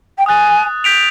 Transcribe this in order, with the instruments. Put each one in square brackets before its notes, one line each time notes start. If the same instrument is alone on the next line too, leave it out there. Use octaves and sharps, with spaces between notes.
[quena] G5
[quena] G#5 [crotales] D#6 F#6 A6
[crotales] G6 B6 D7 F7